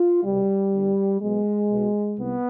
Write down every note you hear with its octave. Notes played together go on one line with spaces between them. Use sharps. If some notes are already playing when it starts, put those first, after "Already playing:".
Already playing: F4
C2 B2 G3
G1 G2 D3
B1 B2 G#3
B1 B2
C2 B3